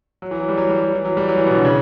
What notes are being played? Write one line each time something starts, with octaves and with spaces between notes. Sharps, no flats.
F#3
E3
F#3
G3
F#3
G3
F#3
E3
F#3
G3
F#3
E3
B2
D3
C#3